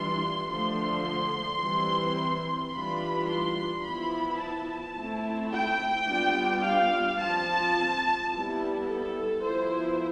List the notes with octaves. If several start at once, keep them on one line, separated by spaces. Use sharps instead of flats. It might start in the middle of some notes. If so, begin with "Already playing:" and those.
Already playing: E3 G3 D4 F4 C6
D3 F3 A3 C6
E3 G3 C4
E3 G3 D4 F4 B5
C6
F3 B3 E4 B5
A5
A3 C4 E4
G5
G3 B3 D4 F4
F5
F3 C4 F4 A5
G3 B3 E4
A4
F3 B3 E4 C5